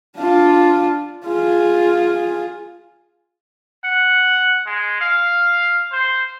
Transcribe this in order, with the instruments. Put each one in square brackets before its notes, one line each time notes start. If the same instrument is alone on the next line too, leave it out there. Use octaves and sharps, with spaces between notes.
[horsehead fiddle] D4 F4
F4 G#4
[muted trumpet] F#5
G#3
F5
C5